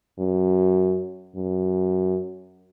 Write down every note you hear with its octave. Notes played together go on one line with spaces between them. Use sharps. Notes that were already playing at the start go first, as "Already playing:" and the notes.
F#2
F#2